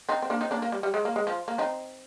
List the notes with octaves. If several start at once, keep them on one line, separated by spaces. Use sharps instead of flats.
C4 D#4
C4
A#3 D4
C4 D#4
A#3 D4
A#3
G3
G3
G#3
A#3
G#3
F3
A#3
C4 D#4